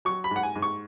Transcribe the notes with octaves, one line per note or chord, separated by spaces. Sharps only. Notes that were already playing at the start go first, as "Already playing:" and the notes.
F#3 C#6
B5
G#2
F#5
G#5
G#2
C#6